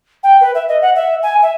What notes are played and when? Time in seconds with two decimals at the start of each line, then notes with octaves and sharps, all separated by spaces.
0.23 G5
0.41 B4
0.55 E5
0.68 D#5
0.82 F#5
0.95 E5
1.23 G#5
1.42 E5